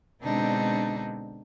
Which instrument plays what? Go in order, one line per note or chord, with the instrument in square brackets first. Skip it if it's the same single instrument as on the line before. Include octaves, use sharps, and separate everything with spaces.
[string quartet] B2 D3 G#3 C4 D4 D#4